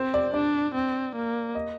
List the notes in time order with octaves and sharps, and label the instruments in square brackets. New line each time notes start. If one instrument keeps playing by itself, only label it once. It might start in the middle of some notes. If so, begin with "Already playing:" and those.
Already playing: [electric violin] C4 [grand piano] C5
[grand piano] D5
[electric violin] D4 [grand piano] D5
[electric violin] C4
A#3
[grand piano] D#5